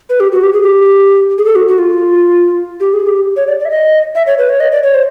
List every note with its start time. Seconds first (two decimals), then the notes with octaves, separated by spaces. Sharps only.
0.09 B4
0.20 G4
0.32 F#4
0.43 G4
0.53 G#4
0.62 G4
1.38 G#4
1.45 A4
1.55 F#4
1.68 F#4
1.79 F4
2.80 G4
2.93 G#4
3.07 G4
3.36 C#5
3.47 D5
3.59 D5
3.65 E5
3.70 D#5
4.15 E5
4.27 C#5
4.38 B4
4.49 C#5
4.60 D#5
4.72 D5
4.83 C#5
4.94 C5